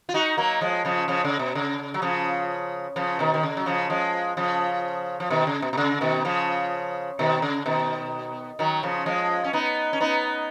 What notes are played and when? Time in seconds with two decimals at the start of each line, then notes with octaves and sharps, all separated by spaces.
0.09 F4
0.14 D#4 F#4
0.37 F#3 A#3
0.61 F3 G#3
0.85 C#3 F3
1.08 C#3 F3
1.24 C#3
1.39 B2
1.55 C#3
1.94 F#3
2.02 C#3 F3
2.96 C#3 F3
3.19 B2 D#3
3.34 D#3
3.43 C#3
3.57 F#3
3.66 C#3 F3
3.90 F3 G#3
4.37 C#3 F3
5.20 F3
5.30 B2 D#3
5.47 C#3
5.62 B2
5.73 B2
5.77 C#3
6.01 B2 D#3
6.25 C#3 F3
7.19 B2 D#3
7.42 C#3
7.66 B2 D#3
8.59 D#3 F#3
8.83 C#3 F3
9.06 F3 G#3
9.44 C#4
9.53 B3 D#4
9.93 C#4
10.00 B3 D#4